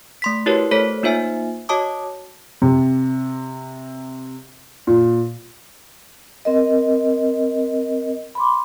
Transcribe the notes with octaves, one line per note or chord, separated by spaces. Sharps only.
A3 C6 B6
E4 F#4 G4 A#4 B4 C#5
A3 A4 C5 C#5 B6
A#3 D#4 F4 C5 E5 G#5
F#4 C#5 D#5 A5 D6 D#6
C3
A#2
C4 A#4 D#5
B5 C6 D6